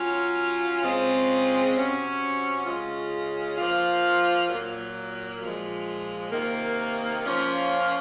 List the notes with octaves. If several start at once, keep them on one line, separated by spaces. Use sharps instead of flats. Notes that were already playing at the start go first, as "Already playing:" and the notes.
Already playing: F#3 C#4 F4
C#3 G#3 C4 F4
C3 F#3 C#4
C#3 G#3 C#4 F4
F3 A#3 F4
A#2 F#3 A#3
A#2 F3 G#3
C3 D#3 A#3
F3 A#3 C#4 F4